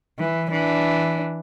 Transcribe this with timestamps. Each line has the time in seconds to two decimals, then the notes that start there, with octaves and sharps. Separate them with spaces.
0.19 E3
0.51 E3 D4